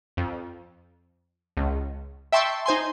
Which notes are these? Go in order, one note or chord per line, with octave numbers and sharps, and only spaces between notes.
F2
C#2
E5 G5 A5 C6 C#6 E6
D#4 C5 G#5 C6